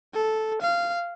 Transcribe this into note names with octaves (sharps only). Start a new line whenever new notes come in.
A4
F5